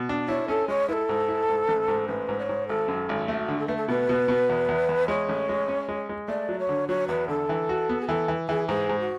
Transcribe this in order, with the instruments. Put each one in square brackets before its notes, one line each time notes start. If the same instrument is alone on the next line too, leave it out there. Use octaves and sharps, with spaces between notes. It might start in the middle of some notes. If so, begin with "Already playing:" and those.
Already playing: [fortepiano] B2
D4
[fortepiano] E4 [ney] C#5
[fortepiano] C#4 [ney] A4
[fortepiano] G#3 [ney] C#5
[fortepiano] E4 [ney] B4
[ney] A4
[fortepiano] G#2
E4
G#2
A1
G#2
[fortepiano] A1 [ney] B4
[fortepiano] G#2
[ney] D5
C#5
[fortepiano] G#2
[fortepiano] G#1 [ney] A4
[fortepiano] F#2
G#1
[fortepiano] A3 [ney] G#4
[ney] F#4
[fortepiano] D3
[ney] A4
[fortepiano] A3 [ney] B4
[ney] A4
[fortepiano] B2 [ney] B4
[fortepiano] B2
B2
E2
E2
E2
[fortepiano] G#3 [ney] C#5
[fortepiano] A1
G#3
C#4
G#3
G#3
[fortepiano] A3 [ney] D5
[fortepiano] F#3
[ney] C#5
[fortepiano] D3
[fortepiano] F#3 [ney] C#5
[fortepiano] E2 [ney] B4
[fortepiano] D3 [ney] A4
[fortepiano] E3
F#4
B3
[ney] G#4
[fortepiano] E3 [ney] A4
[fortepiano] E3
[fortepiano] E3 [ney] G#4
[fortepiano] G#2 [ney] G#4
[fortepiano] G#2
[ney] F#4